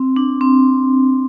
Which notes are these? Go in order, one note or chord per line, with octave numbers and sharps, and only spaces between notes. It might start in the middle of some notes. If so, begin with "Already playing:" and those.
Already playing: C4
D4
C4